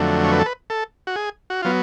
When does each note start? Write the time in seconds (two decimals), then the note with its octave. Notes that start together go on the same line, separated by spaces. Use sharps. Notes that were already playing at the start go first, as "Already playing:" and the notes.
Already playing: F2 D3 F#3 A3
0.24 C#5
0.32 B4
0.39 A4
0.46 B4
0.70 A4
1.07 F#4
1.16 G#4
1.50 F#4
1.62 F#3 B3 F4